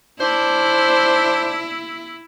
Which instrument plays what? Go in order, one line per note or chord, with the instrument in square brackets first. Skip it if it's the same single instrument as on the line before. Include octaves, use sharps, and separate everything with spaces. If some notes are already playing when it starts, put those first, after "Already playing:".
[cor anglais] D4 [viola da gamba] E4 [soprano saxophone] C5